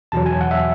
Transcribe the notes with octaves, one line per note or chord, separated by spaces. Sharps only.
E2 B2 F#3 A5
G#5
F#5
E5